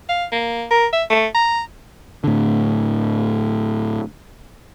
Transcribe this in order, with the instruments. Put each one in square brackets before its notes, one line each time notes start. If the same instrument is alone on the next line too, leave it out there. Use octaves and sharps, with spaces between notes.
[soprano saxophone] F5
A#3
A#4
E5
A3
A#5
[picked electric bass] A2 D3